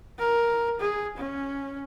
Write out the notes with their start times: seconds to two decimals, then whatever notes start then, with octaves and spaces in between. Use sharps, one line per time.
0.19 A#4
0.80 G#4
1.17 C#4